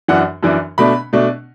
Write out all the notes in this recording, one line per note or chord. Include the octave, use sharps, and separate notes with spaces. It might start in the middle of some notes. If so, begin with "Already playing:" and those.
F#2 E3 D4 F#5
F#2 E3 D4
B2 A3 D4 B5
B2 A3 D4